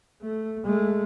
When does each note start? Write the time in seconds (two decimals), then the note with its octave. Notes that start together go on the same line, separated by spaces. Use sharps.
0.22 A3
0.64 G#3 A3